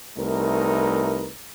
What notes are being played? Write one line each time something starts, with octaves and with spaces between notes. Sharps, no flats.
C2 A3 D#4 A#4 B4